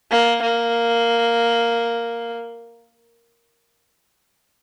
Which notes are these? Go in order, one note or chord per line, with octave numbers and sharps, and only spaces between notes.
A#3
A#3